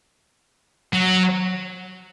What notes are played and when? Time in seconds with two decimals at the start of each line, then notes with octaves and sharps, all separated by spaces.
0.93 F#3